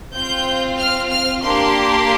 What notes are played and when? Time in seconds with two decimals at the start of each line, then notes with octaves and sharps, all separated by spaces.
0.14 C4 F4 G6
0.79 F6
1.10 F6
1.43 A#3 D4 G4 C6